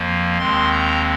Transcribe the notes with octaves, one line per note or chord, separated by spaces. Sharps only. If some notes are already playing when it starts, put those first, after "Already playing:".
Already playing: F2 F3 A#3
D#2 D#3 G#3 C4 C6
A#5